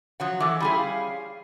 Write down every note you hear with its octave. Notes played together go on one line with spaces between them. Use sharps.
F3 F#3 F#5
E3 A3 D6 E6
G3 C#4 E4 G#4 B5 C6
F5